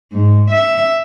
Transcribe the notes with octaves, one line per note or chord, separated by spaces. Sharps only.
G#2
E5